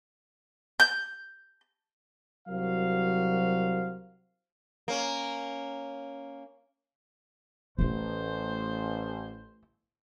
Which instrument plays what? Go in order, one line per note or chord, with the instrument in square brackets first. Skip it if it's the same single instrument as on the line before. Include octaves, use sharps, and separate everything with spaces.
[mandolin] G6
[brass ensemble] C2 F#3 F#4 A#4 C5 F5
[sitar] A#3 C#4
[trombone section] A1 [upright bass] A3 E4 [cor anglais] C5